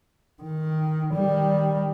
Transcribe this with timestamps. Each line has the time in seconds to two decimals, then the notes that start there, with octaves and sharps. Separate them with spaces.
0.43 D#3
1.14 D#3 G3